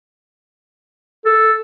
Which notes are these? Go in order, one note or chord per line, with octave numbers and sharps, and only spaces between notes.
A4